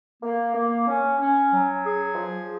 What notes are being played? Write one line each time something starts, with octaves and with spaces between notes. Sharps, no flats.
A#3
A#3
C#4
C#4
F#3
G#4
F3